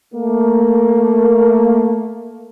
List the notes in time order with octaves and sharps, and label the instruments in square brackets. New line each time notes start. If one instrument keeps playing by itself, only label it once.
[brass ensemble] A3 A#3